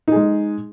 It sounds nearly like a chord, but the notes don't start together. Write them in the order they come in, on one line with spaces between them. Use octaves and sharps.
D#4 G#4 G#3